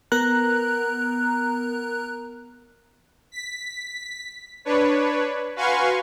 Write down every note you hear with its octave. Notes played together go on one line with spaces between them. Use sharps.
B3 A#4 A#5 F#6
B6
D4 B4 C#5
F#4 B4 F5 G#5 C6 C#6